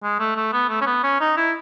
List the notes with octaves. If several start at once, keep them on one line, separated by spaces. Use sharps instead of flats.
G#3
A3
A3
B3
A3
C#4
B3
C#4
D#4
E4